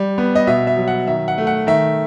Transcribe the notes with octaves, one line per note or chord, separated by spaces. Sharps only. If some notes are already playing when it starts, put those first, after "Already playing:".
Already playing: G3
B3
D#5
B2 E5
E5
F#3
F#5
D#3 E5
F#5
A3
F#5
D#3 E5